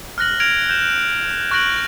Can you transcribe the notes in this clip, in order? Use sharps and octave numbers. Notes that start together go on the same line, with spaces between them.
F6 F#6 A#6 F#7
F6 G#6 A#6 D7 F7
G6 E7
C#6 F#6 G6 A#6 D7 F#7